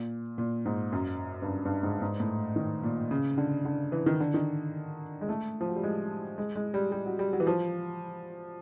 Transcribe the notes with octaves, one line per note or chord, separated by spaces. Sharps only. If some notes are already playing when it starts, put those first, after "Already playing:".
Already playing: A#2
A#2
G#2
F#2
G2
F#2
G2
G#2
G#2
A2
D#3
A#2
C#3
D3
D3
E3
D#3
D3
D#3
G#3
A3
F3
F#3
G3
G#3
G#3
G#3
G3
G3
F#3
G3
F#3
E3
F3